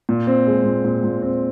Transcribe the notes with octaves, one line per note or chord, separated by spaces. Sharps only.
A#2
C4
G#3
A#2
A#2
A#2
C4